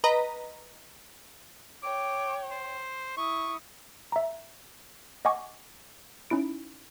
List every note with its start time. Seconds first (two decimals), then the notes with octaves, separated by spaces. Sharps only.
0.04 B4 D#5 A#5
1.83 C#5 G5 D6
2.51 C5
3.17 E4 C#6 D#6
4.12 E5 A#5
5.25 D#5 F#5 G#5 C#6 D6
6.30 C#4 D#4 E4 D7